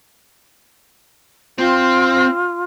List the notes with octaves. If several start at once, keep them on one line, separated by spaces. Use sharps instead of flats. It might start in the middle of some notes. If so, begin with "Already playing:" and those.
C4 F4